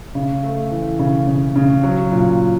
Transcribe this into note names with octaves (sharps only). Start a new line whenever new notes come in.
C#3
A3
E3
C#3
C#3
C#3
F#3
A#2